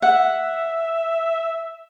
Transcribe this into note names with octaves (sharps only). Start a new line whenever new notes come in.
E5 F#5